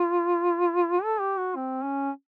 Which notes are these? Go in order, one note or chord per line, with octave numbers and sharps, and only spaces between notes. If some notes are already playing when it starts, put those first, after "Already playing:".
Already playing: F4
A4
G4
F#4
C4
C#4